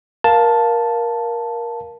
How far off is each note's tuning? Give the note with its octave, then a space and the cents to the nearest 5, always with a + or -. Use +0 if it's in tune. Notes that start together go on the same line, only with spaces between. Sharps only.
A#4 +15 F5 +0 A5 +0